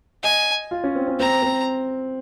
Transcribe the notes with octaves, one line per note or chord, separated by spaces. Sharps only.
D#5 G#5
F4
C#4
C4
C#4
C4 A#5
C4